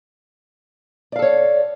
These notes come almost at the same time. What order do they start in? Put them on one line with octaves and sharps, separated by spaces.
D5 F5 A4 C#5